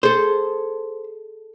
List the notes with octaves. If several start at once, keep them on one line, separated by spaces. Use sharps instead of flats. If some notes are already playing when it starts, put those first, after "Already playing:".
G#4 A4 C5